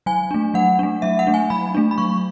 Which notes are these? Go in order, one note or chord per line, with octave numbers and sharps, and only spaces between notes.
F#3 G#5
A3 D4
F#3 F#5
A3 D4
F#3 E5
F#5
A3 D4
G#5
F#3 B5
A3 D4
B5
F#3 C#6